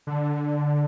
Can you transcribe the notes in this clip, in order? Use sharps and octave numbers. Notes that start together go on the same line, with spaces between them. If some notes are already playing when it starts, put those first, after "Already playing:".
D3